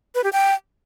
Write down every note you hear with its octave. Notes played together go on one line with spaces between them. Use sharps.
B4
G4
G5